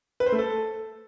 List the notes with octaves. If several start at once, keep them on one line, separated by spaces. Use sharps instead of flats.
B4
C5
A3
A4